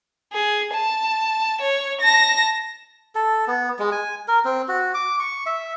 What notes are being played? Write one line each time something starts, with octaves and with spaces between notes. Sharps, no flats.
G#4
A5
C#5
A5 A#6
A4
B3
G#3
G#5
A#4
C4
F#4
D6
C#6
E5